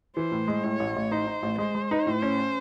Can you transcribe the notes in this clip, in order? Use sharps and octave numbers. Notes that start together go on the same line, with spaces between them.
E3 C5
A2
G#3
A2 C#5
A1
A1
D#4 C5
D#4
A1
G#3 C5
G#3
D#4
A2
C#4
C#4